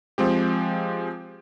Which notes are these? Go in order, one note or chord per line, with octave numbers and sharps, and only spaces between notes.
F3 G#3 C4 G4